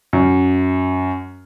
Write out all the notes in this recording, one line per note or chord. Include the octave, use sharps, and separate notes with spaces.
F#2